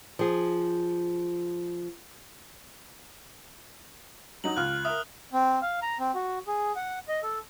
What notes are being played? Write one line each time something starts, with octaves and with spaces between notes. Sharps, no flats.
F3 G#4
F#3 D#4 F#7
C#2 F6 F#6
A#4 E5 D#6 F6
C4
F5
A#5
C4
F#4
G#4
F#5
D#5
A4